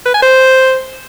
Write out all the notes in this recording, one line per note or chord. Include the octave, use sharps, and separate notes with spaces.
B4
G#5
C5